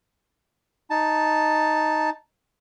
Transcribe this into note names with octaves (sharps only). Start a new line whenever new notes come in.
D#4 A5